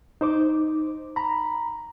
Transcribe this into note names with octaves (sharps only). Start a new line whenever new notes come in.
D#4 C5 D6
A#5 B5